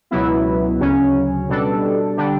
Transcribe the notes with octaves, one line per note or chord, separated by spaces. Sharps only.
C#2 B2 F#3 B3 E4
D2 C#3 F#3 C#4
B2 G3 D4 A4
D3 G3 D4 G4